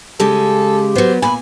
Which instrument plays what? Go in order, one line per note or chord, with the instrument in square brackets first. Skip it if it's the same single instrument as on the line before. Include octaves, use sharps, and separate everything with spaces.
[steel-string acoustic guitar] C#3 G#3 [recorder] G4 [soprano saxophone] A4
[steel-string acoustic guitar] F#3 B3 [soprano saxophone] C5
[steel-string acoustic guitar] A#2 [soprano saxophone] G#5 [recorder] B5